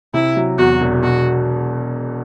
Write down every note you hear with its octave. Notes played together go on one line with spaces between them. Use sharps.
C3 E4
F#3
E2 F#4
E1
B2 F#4